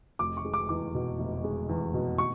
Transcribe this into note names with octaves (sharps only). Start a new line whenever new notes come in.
F1 D6
C#6
G#3
D6
E2 D6
B2
F1
G#3
E2
B2
C#6